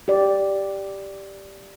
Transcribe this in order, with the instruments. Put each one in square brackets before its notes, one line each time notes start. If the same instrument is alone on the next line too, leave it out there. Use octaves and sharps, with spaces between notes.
[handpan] G4 D5